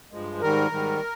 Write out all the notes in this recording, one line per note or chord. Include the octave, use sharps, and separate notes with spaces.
G2 F3 G#3
G#2 D#3 G3 A#4
G#2 D#3 G3